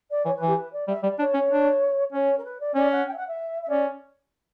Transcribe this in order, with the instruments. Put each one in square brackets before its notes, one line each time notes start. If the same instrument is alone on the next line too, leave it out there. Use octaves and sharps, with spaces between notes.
[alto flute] D5
[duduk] E3 [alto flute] C#5
[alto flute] B4
[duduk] E3
[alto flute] G4
B4
D5
[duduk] G3 [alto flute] E5
[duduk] G3 [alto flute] D5
[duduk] D4 [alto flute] C#5
[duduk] C#4
D4
[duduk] C#4 [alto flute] C#5
[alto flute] A#4
B4
D5
[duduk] C#4 [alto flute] D5
[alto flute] F#5
G5
E5
F#5
E5
E5
[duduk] C#4 [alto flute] D5